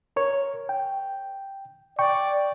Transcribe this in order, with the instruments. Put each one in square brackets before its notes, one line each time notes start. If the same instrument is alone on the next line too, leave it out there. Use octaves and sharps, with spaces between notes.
[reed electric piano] A#4 C#5
G5
[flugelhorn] D5 [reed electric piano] G5 C#6